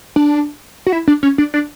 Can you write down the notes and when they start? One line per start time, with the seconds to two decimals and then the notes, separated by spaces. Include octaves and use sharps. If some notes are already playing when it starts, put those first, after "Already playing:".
0.16 D4
0.87 F#4
0.92 E4
1.08 D4
1.23 C#4
1.38 D4
1.54 D4